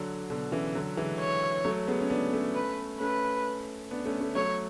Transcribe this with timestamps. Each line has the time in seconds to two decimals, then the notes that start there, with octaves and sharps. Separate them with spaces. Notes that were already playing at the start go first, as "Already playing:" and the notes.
Already playing: D3 F#3
0.30 B2 D3
0.52 C#3 E3
0.75 D3 F#3
0.97 E3 G#3
1.19 C#5
1.65 F#3 A3
1.88 G#3 B3
2.00 C#4
2.10 B3 D4
2.33 A3 C#4
2.55 B4
3.00 A3 C#4 B4
3.91 B3 D4
4.05 A3 C#4
4.21 A3 C#4
4.35 F#3 A3 C#5